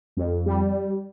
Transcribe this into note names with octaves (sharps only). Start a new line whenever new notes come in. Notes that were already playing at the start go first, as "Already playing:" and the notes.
F2
G3